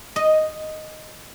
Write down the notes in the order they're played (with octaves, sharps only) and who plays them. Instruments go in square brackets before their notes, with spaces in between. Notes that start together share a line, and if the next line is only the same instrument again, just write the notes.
[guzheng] D#5